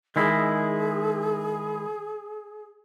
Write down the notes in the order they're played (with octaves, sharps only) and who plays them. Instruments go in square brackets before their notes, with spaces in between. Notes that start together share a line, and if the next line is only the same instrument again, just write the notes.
[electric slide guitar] D#3 G#3 E4 [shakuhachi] G#4